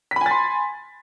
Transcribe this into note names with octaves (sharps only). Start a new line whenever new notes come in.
G#5 B5 C6 A6 B6